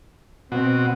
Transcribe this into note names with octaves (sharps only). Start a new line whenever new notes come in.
B2 C4 F#4